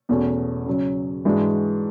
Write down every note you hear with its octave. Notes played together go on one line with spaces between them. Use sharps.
E2 B2 A3 C#4 F#4
C#3 F#3 C#4
G#2 E3 G#3 D4 F#4